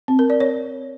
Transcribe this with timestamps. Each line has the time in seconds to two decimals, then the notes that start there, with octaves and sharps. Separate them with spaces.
0.08 C4
0.19 A#4
0.30 D5
0.40 C#5